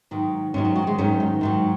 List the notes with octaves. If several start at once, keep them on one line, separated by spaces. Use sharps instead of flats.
G#2 D#3 F#3
G#2 D#3 F#3 C#4
F#4
F#3
G#3
G#2 D#3 F#3 C#4
D#4
G#2 D#3 F#3